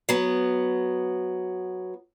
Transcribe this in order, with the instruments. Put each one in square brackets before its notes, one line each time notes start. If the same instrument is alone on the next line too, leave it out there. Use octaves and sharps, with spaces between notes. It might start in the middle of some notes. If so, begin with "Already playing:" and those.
[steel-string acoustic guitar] F#3 B3